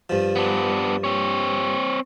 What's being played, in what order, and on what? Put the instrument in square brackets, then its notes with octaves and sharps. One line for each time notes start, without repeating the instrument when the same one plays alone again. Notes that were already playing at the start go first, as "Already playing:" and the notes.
[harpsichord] G2 F3
[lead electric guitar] B3 D4
C4 C#5